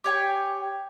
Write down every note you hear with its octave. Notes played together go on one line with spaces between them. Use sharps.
G4 C#5 G5 G#5